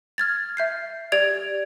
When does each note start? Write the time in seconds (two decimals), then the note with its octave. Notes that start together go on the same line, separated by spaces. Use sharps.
0.18 F6 G#6 A6
0.57 E5 G6 C7
1.12 G4 D5 G#6 D7 F7